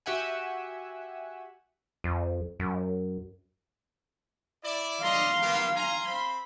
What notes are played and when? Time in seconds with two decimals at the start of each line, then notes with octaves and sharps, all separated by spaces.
0.06 F#4 G4 E5 F#5 G#5
2.04 F2
2.60 F#2
4.64 E4 D5
5.02 A4 D5 D#5 F5 A#5 C6
5.42 A#3 B3 G4
5.75 G#5 A#5 C6
6.05 C4 B5